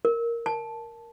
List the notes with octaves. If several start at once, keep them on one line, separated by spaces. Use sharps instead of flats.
A#4
A5